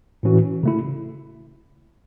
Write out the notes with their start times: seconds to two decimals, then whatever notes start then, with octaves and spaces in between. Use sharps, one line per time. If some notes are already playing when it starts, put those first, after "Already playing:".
0.23 A2 E3 C#4 F#4
0.63 C#3 A3 E4